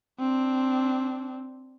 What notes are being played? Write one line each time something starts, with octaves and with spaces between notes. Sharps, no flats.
C4 D4